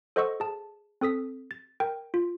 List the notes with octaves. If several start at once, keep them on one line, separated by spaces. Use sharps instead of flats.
A4 C5 D#5 F#5 C#6 E6
G#4 A5
C4 A4 D#6 B6
A6
A#4 G5
F4